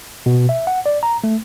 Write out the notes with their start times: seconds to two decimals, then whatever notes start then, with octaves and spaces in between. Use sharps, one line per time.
0.26 B2
0.49 E5
0.67 F#5
0.86 D5
1.03 A#5
1.24 A3